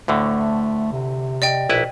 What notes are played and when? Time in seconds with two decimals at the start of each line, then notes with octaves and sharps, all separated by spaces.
0.08 D2 A2 D3 A3
0.93 C3
1.42 D5 D#5 G5
1.69 A#1 B2 E4 B4